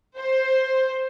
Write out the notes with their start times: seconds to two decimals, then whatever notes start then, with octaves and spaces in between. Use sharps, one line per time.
0.17 C5